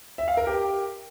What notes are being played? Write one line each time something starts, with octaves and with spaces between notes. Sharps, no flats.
E5
F5
A#4
G4